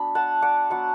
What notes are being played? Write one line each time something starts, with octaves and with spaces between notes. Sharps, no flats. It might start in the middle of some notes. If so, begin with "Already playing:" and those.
Already playing: F#3 B3 D4 B5
F#5 A5
D5 F#5
F#3 B3 D4 F#5 A5